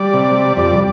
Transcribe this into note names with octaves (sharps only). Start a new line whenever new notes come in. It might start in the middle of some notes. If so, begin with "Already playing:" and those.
Already playing: G3 D5
C3
G3
F2 D5